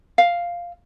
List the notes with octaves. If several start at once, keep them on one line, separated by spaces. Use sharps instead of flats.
F5